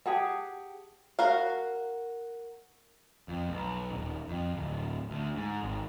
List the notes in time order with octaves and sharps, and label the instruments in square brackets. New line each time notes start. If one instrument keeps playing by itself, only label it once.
[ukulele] G4 G#4 F#5 A5
[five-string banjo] F#4 A#4 F5
[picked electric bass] F2
B1
D#1
F2
D1
D2
G#2
G#1